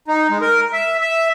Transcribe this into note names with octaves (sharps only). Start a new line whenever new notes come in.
D#4
G#3
A#4
E5
E5